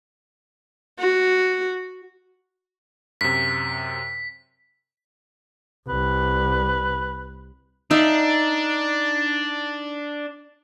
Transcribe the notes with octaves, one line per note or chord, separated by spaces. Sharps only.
F#4
F#2 C3 B6
C2 B4
D4 D#4 E5 F5